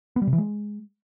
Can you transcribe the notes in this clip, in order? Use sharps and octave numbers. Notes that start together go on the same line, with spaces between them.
B3
G3
C3
E3
G#3